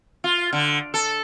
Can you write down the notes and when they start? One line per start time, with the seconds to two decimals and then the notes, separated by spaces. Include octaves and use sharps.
0.24 F4
0.53 D3
0.94 A4